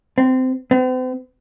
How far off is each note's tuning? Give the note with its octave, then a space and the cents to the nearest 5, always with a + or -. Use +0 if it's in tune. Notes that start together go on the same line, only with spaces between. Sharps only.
C4 -20
C4 -45